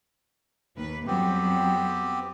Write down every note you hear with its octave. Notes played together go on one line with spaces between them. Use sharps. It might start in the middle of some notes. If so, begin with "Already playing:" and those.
D#2 A#3 B4
F2 F#3 G3 B3 C4 G4